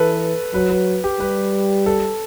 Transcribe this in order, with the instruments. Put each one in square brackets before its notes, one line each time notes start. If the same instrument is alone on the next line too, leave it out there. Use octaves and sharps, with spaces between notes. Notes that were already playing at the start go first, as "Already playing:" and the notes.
Already playing: [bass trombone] E3 [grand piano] A4 B4
[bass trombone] F#3 [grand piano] B4
[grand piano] B4
G4
[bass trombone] G3 [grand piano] B4
[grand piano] A4